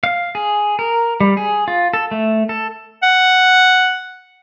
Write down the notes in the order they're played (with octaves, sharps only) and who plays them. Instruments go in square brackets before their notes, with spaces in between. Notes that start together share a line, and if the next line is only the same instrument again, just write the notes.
[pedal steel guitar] F5
G#4
A#4
G3
G#4
F4
A4
A3
A4
[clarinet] F#5